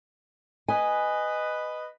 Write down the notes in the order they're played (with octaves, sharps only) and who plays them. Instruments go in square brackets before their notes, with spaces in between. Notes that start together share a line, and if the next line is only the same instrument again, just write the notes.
[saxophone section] B4 D#5 [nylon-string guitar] G#5